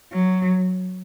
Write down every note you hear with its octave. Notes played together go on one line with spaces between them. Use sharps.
F#3